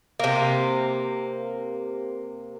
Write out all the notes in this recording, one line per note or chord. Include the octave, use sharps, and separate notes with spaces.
C3 A#3